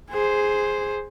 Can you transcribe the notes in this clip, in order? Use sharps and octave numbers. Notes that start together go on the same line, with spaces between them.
G#4 C5